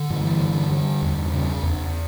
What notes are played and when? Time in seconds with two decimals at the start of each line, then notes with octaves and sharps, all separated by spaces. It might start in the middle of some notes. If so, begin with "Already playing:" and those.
Already playing: D3
0.10 G2 E3
0.40 D3
0.71 G2
1.02 E2
1.33 C#3
1.63 E2